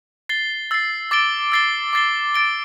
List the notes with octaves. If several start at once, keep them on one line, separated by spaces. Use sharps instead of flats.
A6 C7 G7
E6 A6 C7
D6 A6 D7 G7
E6 A6 C7 G7
D6 A6 C7 G7
A6 D7 G7